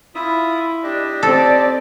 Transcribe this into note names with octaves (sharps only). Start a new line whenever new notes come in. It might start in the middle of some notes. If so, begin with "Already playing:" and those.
E4 F4 E5 D#6
D4 G4 D#5
C4 A4 D5